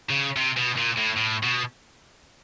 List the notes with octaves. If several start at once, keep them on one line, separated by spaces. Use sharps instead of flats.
C#3
C3
B2
A#2
A2
A2
B2